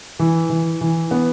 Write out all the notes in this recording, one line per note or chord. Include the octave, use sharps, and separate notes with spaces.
E3
E3
E3
B3